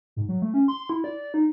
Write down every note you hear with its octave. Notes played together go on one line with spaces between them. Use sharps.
G#2
F#3
A3
C#4
C6
E4
D5
D5
D#4